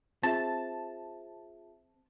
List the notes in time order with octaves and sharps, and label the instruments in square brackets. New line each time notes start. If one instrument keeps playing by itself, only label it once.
[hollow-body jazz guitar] C4 [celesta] F4 G#4 E5 [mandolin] A5